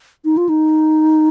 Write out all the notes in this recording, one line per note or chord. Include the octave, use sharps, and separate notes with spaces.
D#4
F4
D#4